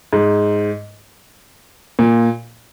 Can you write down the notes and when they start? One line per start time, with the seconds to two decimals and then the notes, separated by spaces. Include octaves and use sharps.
0.13 G#2
1.99 A#2